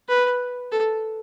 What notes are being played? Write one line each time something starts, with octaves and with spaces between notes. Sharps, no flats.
B4
A4